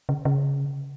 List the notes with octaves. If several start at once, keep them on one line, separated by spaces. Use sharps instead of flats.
C#3
C#3